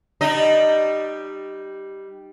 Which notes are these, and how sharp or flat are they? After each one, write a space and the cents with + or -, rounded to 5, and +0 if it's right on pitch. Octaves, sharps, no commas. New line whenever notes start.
G3 -5 D#4 -35 D#5 +0